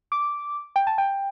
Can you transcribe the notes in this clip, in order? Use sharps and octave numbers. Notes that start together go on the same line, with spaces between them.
D6
G5
A5
G5